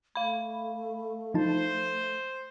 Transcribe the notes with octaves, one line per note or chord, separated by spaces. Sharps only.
A3 F5 B5
F3 D#4 C5 A5